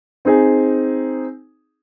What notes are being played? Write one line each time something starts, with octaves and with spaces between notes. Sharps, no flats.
C4 D#4 G#4